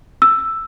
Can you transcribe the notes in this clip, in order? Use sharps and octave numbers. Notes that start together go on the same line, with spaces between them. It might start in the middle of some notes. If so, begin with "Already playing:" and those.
E6